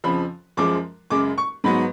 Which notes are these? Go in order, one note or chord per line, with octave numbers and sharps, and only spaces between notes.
F2 C#3 F3 B5
F#2 F3 G#3 D6
F#2 C#3 G#3 D6
C#6
G#2 F#3 B3 B5